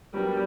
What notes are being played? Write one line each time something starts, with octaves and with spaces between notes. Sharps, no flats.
F#3 G3 B3 D4 F#4 A#4